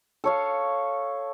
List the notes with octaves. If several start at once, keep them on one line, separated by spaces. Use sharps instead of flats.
A4 C#5 F5